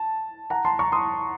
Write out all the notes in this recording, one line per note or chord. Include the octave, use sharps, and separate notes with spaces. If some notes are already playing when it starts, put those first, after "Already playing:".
Already playing: A5
F#5 A#5
A5 C6
A#5 C#6
C6 D#6